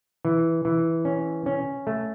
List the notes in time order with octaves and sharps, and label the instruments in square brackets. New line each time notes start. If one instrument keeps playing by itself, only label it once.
[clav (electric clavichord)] E3
E3
C#4
C#4
A3